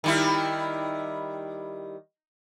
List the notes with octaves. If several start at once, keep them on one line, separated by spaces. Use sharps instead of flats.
D#3 G3 E4